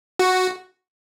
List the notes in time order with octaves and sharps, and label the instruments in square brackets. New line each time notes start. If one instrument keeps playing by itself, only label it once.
[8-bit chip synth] F#4